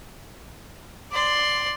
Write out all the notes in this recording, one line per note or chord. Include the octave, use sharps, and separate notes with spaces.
D5 C6